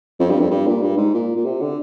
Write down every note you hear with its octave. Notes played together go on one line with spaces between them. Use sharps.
F2
G2
F2
G2
A#2
G2
G#2
A#2
A#2
C3
D3